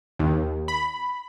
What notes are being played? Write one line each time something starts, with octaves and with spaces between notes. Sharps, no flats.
D#2
B5